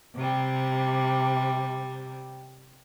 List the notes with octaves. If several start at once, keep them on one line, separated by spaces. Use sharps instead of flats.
C3 G3